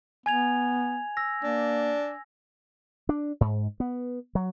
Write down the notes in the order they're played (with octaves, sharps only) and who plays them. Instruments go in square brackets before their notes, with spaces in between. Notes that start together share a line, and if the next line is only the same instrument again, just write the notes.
[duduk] B3 [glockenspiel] G#5 G#6 F7
[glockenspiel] E6 A#6
[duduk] A#3 [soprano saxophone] D4
[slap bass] D4
G#2
B3
F#3